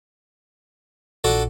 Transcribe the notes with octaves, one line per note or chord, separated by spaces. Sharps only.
A#1 D4 F#4 A4